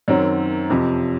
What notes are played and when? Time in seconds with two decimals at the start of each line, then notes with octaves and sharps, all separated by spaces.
0.08 F#2 D#3 F#3 C4
0.69 F2 C3 F3